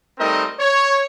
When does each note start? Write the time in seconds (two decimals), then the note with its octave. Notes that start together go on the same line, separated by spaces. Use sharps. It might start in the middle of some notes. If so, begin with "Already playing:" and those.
0.19 G3 A3 C4 D#4 A#4 D#5
0.59 C#5